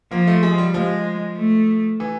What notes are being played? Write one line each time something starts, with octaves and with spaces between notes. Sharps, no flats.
F3 A#3
A3
G#3
G3
F3 G#3
A3
E3